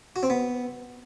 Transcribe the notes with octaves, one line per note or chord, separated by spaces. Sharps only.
F#4
C4
B3